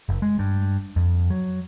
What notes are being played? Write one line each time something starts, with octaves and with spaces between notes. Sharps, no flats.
F#1
G#3
G2
F2
F#3